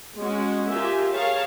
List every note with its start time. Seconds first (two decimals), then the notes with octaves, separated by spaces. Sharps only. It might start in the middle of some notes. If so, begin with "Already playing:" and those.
0.19 G#3 C#4 F#4
0.68 F4 G4 G#4 A#4 E5 G#5
1.12 G#4 A#4 C#5 F5 A5